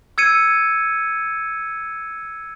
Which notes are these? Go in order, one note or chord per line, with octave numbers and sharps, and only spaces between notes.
E6 G#6 C#7 D#7